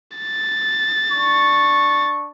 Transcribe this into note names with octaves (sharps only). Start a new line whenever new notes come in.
A6
D4 C#6